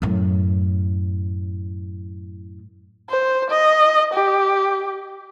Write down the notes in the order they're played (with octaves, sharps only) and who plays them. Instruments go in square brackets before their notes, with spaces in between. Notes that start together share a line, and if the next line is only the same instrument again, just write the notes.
[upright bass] F#2 A2
[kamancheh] C5
D#5
G4